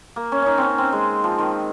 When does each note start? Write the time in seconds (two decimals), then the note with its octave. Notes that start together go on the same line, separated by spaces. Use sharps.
0.16 A#3
0.32 C#4
0.42 C#4 D#4
0.58 C4 C#4
0.78 C4
0.92 G#3
1.24 F3
1.39 D#3